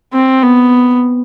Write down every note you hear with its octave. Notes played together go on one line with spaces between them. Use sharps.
C4
B3